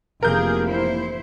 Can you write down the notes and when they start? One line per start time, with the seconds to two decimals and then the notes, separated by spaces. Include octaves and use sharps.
0.23 F1 E3 A#3 G#4 A#4 G6
0.68 E4 C5